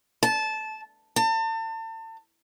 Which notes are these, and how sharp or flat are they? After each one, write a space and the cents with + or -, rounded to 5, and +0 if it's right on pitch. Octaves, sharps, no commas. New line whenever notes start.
A5 -15
A5 +35